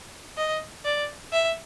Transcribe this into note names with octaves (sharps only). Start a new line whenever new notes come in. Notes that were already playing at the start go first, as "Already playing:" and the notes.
D#5
D5
E5